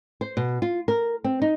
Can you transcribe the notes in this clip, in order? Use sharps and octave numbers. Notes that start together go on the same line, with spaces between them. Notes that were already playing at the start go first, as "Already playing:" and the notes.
C5
B2
F4
A#4
C4
D#4